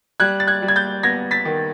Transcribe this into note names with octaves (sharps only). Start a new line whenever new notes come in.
G3 F#6 G#6
A6
F#6 G#6
G3
G#6
G6 A6
B3 G#6 A#6
A6 B6
D#3